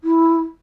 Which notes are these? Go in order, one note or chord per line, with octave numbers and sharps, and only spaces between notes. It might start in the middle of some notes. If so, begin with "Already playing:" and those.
E4